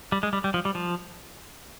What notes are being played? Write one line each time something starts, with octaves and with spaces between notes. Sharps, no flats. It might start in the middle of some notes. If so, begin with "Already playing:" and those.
G3
G#3
G3
G3
F3
G3
F3